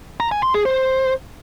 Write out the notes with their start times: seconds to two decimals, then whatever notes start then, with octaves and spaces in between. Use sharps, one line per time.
0.20 A#5
0.32 G#5
0.43 C6
0.54 G#4
0.66 C5